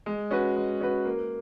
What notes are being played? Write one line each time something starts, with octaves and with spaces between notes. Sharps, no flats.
G#3
C#4 F#4 B4
G#3
C#4 F#4 B4
A#3